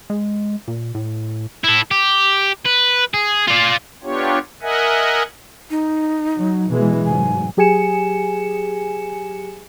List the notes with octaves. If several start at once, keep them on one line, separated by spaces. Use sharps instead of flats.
G#3
A#2
A2
E4 A4
G4
B4
G#4
F4 D5
B3 D4 F4 G4 C#5
A#4 D#5 E5 F#5 G#5
D#4
F#3
B2 E3 G#3
F1 G#2 F#3 G#5
F#3 G4 G#4 G#5 C#7 E7